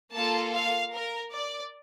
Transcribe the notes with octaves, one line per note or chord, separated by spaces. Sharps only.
A#3 F4 A4 A5
F5
A#4
D5